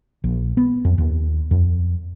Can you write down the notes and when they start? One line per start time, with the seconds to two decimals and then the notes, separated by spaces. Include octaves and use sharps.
0.24 A#1
0.57 B3
0.85 F2
0.98 D#2
1.51 F2